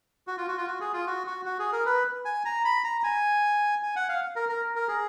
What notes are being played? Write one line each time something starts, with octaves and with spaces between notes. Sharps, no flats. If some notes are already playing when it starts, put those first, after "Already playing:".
F#4
F4
F#4
F4
F#4
G#4
F4
F#4
F#4
F#4
G#4
A#4
B4
G#5
A#5
B5
A#5
G#5
G#5
F#5
F5
A#4
A#4
A#4
G#4